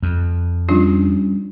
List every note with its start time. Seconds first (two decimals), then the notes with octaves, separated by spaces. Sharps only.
0.03 F2
0.69 F3 G3 C#4 D4 F4